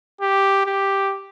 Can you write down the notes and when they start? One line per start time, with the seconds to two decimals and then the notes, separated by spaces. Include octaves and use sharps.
0.21 G4
0.66 G4